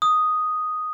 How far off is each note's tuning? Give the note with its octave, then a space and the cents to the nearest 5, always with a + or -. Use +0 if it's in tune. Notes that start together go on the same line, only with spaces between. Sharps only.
D#6 +0